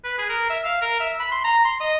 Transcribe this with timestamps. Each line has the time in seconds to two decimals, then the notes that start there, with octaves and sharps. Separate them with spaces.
0.04 B4
0.18 G#4
0.29 A#4
0.50 E5
0.65 F5
0.82 A#4
1.00 E5
1.20 B5
1.32 C6
1.44 A#5
1.65 C6
1.80 D#5